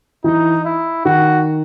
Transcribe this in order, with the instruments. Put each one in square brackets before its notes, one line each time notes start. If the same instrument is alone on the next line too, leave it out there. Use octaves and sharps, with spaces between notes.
[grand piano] E3 [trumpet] D#4
[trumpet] E4
[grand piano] D#3 [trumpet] F#4